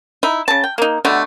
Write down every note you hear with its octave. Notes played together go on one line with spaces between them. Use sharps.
D#4 E4
C#3 A5
G5
A#3 D#4
B2 D3 G3 A3